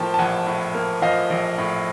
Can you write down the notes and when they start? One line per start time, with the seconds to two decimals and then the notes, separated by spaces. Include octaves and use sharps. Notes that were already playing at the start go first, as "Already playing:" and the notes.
Already playing: A2 F3 A#3 G5 A5
0.14 A5
0.18 A#1 F#5 G#5
0.46 A2
0.74 A#3
1.02 F3 D#5 F5
1.30 A#1
1.58 A2